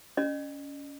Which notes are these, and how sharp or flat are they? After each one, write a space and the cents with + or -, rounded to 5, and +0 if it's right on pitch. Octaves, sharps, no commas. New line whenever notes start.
C#4 +25 D#5 -40